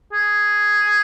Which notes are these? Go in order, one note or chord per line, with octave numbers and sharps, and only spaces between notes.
G#4